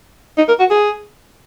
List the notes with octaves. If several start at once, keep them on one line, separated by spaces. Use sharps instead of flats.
D#4
A#4
F#4
G#4